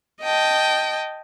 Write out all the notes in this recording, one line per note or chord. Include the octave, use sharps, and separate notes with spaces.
D#5 G5 A5